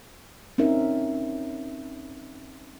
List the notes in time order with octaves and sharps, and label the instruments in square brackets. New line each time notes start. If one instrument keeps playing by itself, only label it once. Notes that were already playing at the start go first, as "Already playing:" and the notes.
[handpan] C4 C#4 D#4 A#4 E5